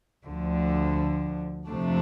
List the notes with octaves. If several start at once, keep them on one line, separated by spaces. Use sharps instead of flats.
D2 D3 F3
F2 C3 F3 A3 D4